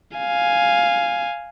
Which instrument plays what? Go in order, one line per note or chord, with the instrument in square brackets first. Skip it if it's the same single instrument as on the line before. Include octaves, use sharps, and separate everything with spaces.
[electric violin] F5 G#5